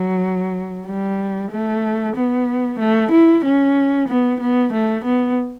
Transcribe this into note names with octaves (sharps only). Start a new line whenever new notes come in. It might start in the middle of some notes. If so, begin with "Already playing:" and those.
Already playing: F#3
G3
A3
B3
A3
E4
C#4
B3
B3
A3
B3